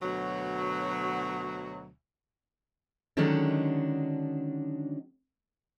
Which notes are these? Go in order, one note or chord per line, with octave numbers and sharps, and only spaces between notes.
D2 B2 F#3
D3 D#3 F#3 G#3 C#4 D4